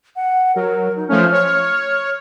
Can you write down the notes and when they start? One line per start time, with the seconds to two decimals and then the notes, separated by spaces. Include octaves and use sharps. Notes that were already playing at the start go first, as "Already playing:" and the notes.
0.16 F#5
0.56 F#3 A#4
0.96 D#4
1.09 F3 A3 C#4 F6
1.32 C#5